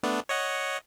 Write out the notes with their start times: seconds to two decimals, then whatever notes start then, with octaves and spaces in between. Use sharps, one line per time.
0.03 A3 B3 D4
0.29 C#5 D#5 F#5